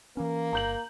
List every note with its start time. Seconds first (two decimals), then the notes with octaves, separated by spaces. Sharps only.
0.17 E3 A#3 C#4
0.53 G1 A#5 G6 F#7